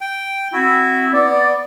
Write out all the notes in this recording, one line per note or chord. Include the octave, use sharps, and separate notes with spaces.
G5
C4 E4 F#4
B3 D5